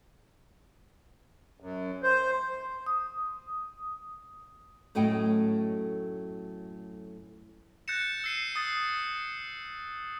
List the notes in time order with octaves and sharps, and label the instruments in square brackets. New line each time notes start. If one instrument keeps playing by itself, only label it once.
[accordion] F#2
C5
[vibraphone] D#6
[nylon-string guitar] F#2 A2 A3 D#5 G5
[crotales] F#6 G6 A6 A#6 C#7 E7
E6 C7 D#7
D#6 A6 C7